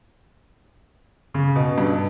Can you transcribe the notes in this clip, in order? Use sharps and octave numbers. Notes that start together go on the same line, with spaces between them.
C#3
B2
G2